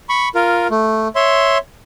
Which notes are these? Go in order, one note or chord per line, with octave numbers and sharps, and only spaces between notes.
B5 C#6
F4 A#4
A3
C#5 E5 C6